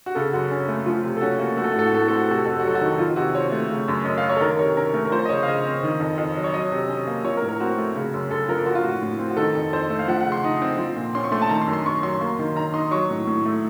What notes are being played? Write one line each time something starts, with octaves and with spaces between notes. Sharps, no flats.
F#4
C#3 A4
F#2 F#4
C#4
A3
F3 F4
C3
A4
C#4 F#4
A#3 F#4
A3 F#4
A4
F#4
A2 A4
F#4
A2 A4
F#4
C4 A4
F#4
A4
C3 F#4
A4
F2 F#4
A4
F#4
F#3 A4
F#4
D#3
F3 F4
C3 F#4
C4 C#5
A3
C#3
F#2
F#2 D#5
F5
F#3
C#5
A4
D#3 A#4
C3 C#5
C#4 A#4
A3 A#4
A#4
F3 C5
D#5
C#3 C#5
F5
C#3 D#5
C4
D#3
F2
F2
F#3
C#5
F#3 D#5
C3
C#4
A#3
F3 C#5
A#4
A2
A#4
C4 F#4
A3
C#3
F#2
F#2 A4
F3 A#4
F3 F#4
F4
A2 F#4
A2
C4
F#4
D#3 A4
F2
F2 C5
A3
F5
F3 F#5
F#5
C#3
C6
D#4
C4
F3
A#2
C#4 C6
C#6
A3 C6
A5
D#3 A#5
C6
F#2
C6
F#2 C#6
F#3 C6
A#3
D#3
D#3 A#5
D#4 C6
F#3 C#6
A2
A2
A3